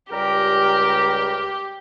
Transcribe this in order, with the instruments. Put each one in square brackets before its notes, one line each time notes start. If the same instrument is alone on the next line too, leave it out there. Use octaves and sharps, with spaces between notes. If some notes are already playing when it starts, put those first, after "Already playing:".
[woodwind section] C#2 G3 A#4 [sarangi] G4